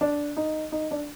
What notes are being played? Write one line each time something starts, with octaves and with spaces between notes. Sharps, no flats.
D4
D#4
D#4
D4